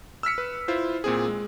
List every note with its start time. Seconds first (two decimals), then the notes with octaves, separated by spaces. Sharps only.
0.23 E6 F6 B6 C#7
0.38 B4
0.68 E4 F4 C5
1.04 A#2 C4 G#4
1.28 G#3